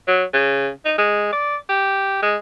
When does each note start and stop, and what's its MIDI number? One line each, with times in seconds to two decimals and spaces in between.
0.08 0.24 54
0.34 0.70 49
0.85 0.96 63
0.98 1.29 56
1.32 1.56 74
1.69 2.21 67
2.23 2.37 56